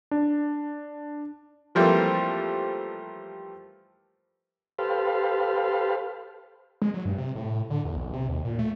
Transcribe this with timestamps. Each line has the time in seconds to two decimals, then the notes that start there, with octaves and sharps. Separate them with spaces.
0.11 D4
1.75 E3 F3 G3 A3 A#3 C4
4.79 G4 A4 B4 C5 F5
6.82 G#3
6.94 F#3
7.05 G2
7.18 C3
7.35 A2
7.70 D3
7.85 E2
7.96 B1
8.13 C3
8.29 D#2
8.45 A#2
8.59 A3